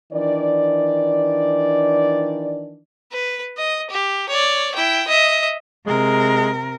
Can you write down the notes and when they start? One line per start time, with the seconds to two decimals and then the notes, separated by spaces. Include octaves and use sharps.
0.13 D#3 E3 D4 D5
3.12 B4
3.57 D#5
3.90 G4
4.29 C#5 D5
4.75 E4 G5
5.07 D#5 E5
5.87 C3 G#3 A#4